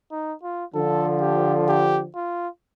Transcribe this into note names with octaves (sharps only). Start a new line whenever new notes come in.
D#4
F4
D3 F3 A4
G4
G4
F4